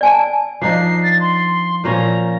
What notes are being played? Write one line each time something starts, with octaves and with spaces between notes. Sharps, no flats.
D5 G#5 A5
F3 D4 D#4 C7
A6
C6
A#2 F3 C#4 A#5